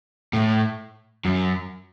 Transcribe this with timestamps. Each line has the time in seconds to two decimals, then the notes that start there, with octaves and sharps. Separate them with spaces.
0.33 A2
1.25 F#2